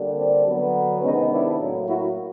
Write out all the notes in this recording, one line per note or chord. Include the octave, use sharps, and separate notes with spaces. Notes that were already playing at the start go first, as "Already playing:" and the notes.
Already playing: D3 G3 A#3
C4 D4
D3 F#3 B3
C3 D#3 G#3 B3 C#4 D#4
D4 E4
A2 F#3 A#3
E4 F#4